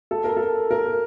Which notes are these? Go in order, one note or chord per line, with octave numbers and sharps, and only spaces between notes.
A4
A#4
A4
A#4